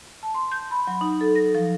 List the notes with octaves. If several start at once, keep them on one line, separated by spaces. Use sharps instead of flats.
A5
C6
G6
B5
F#3
D#4
A4
A#6
F3